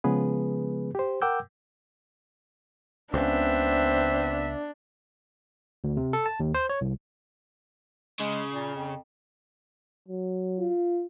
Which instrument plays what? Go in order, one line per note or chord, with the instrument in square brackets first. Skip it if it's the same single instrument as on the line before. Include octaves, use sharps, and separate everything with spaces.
[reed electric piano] C#3 F3 G#3 B3 G#4 B4
G4 C5
A#4 F#5 G5 D6 E6 G6
[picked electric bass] C#2 C#3 [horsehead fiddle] B3 E5 [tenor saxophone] C4 [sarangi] D4
[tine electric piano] D2
C3
A4
A5
D#2
C5
C#5
C2
[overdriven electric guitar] C#3 [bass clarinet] G#3
[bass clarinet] A#2
F2
[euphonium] F#3
[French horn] F4